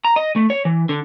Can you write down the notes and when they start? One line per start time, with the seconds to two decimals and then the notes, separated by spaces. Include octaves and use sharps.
0.05 A#5
0.16 D#5
0.36 A3
0.50 C#5
0.65 E3
0.89 D3